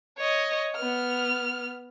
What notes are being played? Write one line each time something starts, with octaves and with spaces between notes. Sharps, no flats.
C#5 D#5
B3 F6